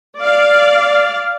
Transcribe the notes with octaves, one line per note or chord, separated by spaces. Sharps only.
D5 F5